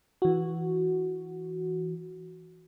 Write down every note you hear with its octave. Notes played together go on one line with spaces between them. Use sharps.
E3 F#4